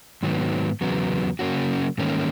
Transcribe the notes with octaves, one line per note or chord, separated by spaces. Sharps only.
G#2 D#3 F#3 B3
E2 C#3 F#3 B3
C#3 F#3 A#3 C#4 F#4
G#2 D#3 A#3 C#4